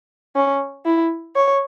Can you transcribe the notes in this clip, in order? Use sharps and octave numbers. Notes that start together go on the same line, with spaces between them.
C#4
E4
C#5